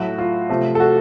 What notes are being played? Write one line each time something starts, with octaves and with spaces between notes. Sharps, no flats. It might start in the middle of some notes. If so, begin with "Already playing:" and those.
Already playing: A2 F#3 A3 F#4
F4
C3 F3 A3
A4
F#4